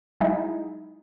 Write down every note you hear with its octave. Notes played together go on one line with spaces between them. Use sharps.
F#3 G#3 D#4 E4